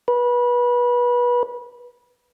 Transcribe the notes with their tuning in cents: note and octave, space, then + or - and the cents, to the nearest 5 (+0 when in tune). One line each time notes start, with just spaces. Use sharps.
B4 -25